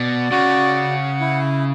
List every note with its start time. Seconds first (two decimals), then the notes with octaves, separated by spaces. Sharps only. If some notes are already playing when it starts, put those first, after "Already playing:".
Already playing: B2 D5
0.31 C#3 F#4
0.76 F#5
1.20 E4